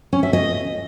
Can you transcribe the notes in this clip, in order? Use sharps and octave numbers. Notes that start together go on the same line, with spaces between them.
C#4
E5
D#5